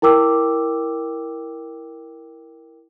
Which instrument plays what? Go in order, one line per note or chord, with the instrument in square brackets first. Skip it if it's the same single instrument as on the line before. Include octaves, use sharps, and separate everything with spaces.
[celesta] E4 A#4 G5 D6 E6